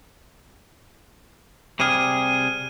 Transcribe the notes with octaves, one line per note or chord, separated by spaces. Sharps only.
C3 G3 G#4 F6 D#7